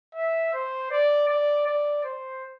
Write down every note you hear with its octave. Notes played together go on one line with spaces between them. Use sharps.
E5
C5
D5
D5
D5
C5